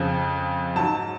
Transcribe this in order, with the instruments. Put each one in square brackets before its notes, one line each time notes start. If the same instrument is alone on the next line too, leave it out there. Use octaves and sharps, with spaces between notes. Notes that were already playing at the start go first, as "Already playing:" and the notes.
Already playing: [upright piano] F2 C#3 F3
G#2 F#3 A5